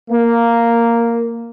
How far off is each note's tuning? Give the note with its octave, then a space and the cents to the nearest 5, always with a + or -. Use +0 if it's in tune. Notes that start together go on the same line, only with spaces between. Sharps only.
A#3 -5